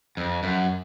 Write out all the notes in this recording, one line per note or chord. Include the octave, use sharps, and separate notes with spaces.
F2
F#2